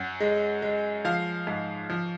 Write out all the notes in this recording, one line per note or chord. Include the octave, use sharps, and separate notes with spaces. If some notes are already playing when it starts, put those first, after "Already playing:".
Already playing: F#2 F#5
G#3
G#3
F3 F5
G#2
F3